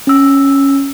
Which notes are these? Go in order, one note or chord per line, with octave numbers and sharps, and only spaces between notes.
C#4 E6